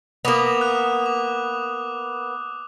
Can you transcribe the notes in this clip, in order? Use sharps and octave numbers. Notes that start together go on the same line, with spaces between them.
A#3 B3 D6 D#6 F7
F#6
D6